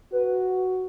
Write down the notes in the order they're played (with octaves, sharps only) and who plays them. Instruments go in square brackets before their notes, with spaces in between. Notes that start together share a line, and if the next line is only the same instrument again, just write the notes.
[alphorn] F#4 [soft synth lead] B4